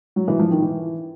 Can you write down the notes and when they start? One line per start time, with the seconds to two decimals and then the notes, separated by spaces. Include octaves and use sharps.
0.16 F#3
0.28 E3
0.39 F3
0.51 D#3
0.62 E3